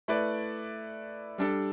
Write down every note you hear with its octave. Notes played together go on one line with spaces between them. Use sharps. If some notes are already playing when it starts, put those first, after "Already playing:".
A3 E4 B4 D5
G3 D4 A4